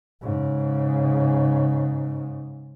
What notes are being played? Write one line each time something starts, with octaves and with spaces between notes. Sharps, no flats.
G#2 C#3